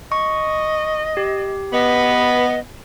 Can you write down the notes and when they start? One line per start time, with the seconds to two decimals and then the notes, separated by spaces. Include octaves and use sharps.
0.12 D#5 C#6
1.17 G4
1.73 B3 D#5 B5